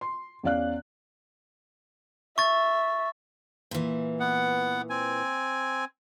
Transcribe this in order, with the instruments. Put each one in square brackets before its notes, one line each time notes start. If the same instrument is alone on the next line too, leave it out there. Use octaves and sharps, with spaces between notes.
[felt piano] C6
E2 C#4 D5 F5 F#6
[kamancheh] E5 [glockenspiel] C#6 A6
[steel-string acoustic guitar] A#2 E3
[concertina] B3 F#5
C4 G#5